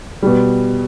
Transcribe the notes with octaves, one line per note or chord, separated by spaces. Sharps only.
B2 G3